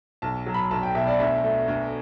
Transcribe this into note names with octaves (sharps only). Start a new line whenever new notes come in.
B1 A5
F#3
B5
B1 A5
G5
B2 E5
D5
D2 E5
A3
D2